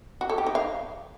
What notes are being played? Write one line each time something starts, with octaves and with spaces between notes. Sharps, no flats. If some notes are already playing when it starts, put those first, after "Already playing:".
F#4
A4
G4
D#4
F5